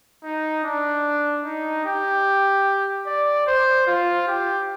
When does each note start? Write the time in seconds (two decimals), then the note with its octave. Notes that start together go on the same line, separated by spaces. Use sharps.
0.23 D#4
0.64 D4
1.44 D#4
1.85 G4
3.07 D5
3.47 C5
3.87 F4
4.28 G4